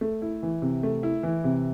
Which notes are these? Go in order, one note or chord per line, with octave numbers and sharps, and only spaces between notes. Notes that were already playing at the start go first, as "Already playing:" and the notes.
A3
E4
E3
C3
A3
E4
E3
C3